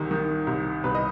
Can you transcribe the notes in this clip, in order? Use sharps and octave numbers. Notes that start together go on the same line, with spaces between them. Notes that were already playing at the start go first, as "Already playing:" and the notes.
Already playing: C2 D#3
D#3
C2
C2 B4
D#5